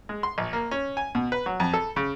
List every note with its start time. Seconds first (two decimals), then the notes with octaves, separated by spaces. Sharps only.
0.09 G#3
0.23 C6
0.38 A#1
0.53 A#3
0.71 C#4
0.97 G#5
1.15 B2
1.32 B4
1.46 F#3
1.60 F2
1.74 A4
1.96 C#3